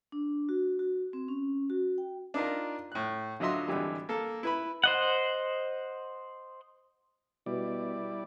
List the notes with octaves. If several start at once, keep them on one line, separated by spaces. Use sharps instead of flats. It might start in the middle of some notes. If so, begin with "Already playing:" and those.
D4
F#4
F#4
C4
C#4
F#4
G5
D4 D#4 F4 A#4
A2 F#6
D3 F#3 F4 D#5 E5 C6
G#1 D3 E3 G3
A#3 A4
E4 B4 B5
C5 D#5 F#5
B2 G3 E4 D5